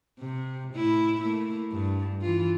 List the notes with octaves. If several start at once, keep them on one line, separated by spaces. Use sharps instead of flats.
C3
A2 E4
A3 A#3 E4
G2
E3 F4